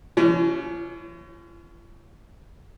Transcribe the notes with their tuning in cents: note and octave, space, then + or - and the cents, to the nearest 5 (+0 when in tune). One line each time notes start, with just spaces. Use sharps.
F3 -45 C#4 +30 C#5 +0